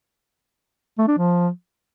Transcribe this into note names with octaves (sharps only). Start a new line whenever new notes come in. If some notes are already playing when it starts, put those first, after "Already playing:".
A3
D4
F3